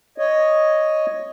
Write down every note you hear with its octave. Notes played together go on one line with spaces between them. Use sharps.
C#5 D#5